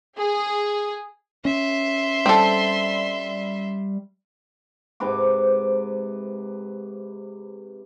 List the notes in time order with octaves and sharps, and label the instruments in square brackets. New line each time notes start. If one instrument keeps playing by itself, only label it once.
[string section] G#4
[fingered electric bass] C#4 [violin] E5 C6
[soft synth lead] G3 [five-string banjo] C4 A4
[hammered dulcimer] G#2 C3 B4 D6